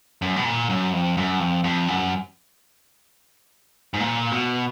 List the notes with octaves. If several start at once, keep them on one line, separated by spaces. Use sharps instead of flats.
F#2
B2
A#2
F#2
F2
F#2
F2
F2
F#2
G#2
A#2
B2